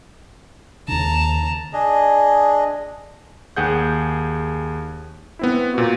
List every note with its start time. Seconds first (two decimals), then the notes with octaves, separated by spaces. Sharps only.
0.88 D#2 C#3 A5 A#5
1.73 D4 G#4 D#5
3.56 D#2 G#4 F#5 G6
5.39 B3 C4 E4
5.74 A#2 F#4